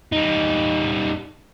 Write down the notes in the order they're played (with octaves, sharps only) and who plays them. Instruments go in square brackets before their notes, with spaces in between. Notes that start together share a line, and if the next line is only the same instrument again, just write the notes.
[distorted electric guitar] G3 D#4